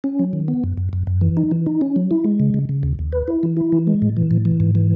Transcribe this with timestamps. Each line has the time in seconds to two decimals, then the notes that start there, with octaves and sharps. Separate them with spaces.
0.04 C#4
0.19 F#3
0.33 D#3
0.48 B3
0.64 F#2
0.77 F#2
0.93 F#2
1.07 F#2
1.21 E3
1.37 D#4
1.51 E3
1.66 D#4
1.81 C#4
1.96 F#3
2.11 E4
2.24 G#3
2.40 C#3
2.54 C#3
2.69 C#3
2.83 D#2
2.99 D#2
3.12 B4
3.28 E4
3.43 E3
3.57 E4
3.72 E3
3.87 G#3
4.02 A2
4.17 E3
4.31 A2
4.45 E3
4.60 G#2
4.75 E3